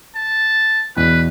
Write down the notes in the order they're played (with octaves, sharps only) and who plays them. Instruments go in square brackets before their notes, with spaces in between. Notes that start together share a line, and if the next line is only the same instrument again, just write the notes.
[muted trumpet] A5
[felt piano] E2 B2 E3 [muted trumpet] B4